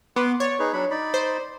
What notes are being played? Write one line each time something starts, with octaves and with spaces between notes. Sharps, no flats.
B3 C6 D6
C#5 D5
D#4 G#4 B4
F#3 D4 B5
D#4 D5 B5
C5